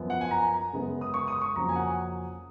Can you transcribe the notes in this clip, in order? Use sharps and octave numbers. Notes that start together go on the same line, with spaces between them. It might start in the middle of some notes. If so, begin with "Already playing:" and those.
Already playing: F#2 F3 B3
F#5
G#5
A#5
F#2 C#3 G#3 B3
D#6
C#6
D#6
C#6
F2 C#3 F#3 A#3 A#5
G#5
F#5